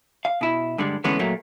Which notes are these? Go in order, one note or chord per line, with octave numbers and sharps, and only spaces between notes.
F5
B2 E4
G2 D3 G3 G#3
D3 E3 G#3 A3 B3 C#4
A#2 F#3 A3 A#3